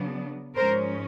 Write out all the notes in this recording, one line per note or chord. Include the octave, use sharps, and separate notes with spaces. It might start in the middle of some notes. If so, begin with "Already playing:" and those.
Already playing: C#3 F#3 B3 D4
G#2 F3 G#3 C#4 A#4 C5